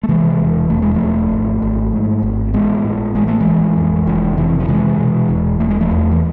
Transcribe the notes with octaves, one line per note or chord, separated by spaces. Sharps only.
A3
C3 E3 G#3
E1
E1 A3
G#3
F3 A3
E1
G#1
G#1
G#2
G#1
A1 G#3 B3
A2
A1 G#3
A3
E3 G#3
A1
F2
F1
C3 E3
F3
C3 E3 G#3
B2
E1
E1 A3
G#3
F3 A3
E2
E3